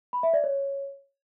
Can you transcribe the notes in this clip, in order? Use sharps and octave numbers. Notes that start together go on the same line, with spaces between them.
B5
E5
D5
C#5